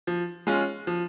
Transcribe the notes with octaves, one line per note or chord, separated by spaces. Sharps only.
F3
G#3 C#4 F4
F3